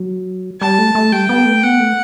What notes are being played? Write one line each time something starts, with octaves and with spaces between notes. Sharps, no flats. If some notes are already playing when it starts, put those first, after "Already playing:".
Already playing: F#3
G3 A5
A3
A3
G3 G5
B3
A3
B3 F#5
A3